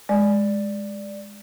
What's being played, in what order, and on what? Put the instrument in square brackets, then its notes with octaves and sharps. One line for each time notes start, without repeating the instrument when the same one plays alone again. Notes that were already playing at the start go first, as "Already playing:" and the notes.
[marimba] G#3 [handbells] D5